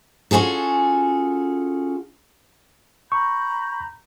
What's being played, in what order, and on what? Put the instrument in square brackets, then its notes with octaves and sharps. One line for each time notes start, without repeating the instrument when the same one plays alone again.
[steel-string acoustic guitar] C#4 F4 F#4 G#4 A4
[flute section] A#5 B5 G6 [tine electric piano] C#6